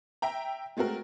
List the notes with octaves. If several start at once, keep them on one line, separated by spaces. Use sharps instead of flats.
E5 G5 A#5
G#3 A3 C4 F#4 A#4